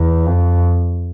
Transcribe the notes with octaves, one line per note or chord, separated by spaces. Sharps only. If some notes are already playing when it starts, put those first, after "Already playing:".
Already playing: E2
F2